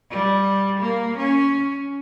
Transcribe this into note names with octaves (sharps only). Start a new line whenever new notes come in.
G3
A#3
C#4